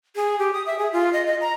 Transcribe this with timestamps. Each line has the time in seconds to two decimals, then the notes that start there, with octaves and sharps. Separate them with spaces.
0.16 G#4
0.38 G4
0.53 D#6
0.66 E5
0.79 G#4
0.93 F4
1.13 D#5
1.26 D#5
1.41 A#5